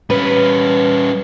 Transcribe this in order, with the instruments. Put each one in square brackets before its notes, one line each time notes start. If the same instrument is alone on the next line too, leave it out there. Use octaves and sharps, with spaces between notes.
[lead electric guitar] G3 C#4 [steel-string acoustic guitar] B4